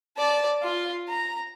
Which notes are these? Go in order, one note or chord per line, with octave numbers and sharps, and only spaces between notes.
D5 A5
F4 C6
A#5